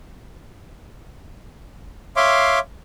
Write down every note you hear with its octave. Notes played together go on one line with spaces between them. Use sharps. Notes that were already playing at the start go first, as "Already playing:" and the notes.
C#5 E5 F5 C6 D6